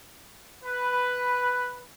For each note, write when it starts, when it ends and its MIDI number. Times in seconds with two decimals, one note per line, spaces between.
0.63 1.83 71